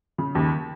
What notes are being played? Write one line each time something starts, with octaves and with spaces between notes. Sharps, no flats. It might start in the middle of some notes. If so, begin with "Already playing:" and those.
C#3
D#2